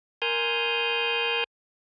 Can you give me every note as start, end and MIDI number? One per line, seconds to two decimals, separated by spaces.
0.22 1.44 70
0.22 1.44 80
0.22 1.44 84
0.22 1.44 87
0.22 1.44 89
0.22 1.44 91